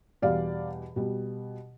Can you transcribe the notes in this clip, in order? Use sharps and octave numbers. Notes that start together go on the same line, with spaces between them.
E2 B2 G3 D5 F5
B2 G3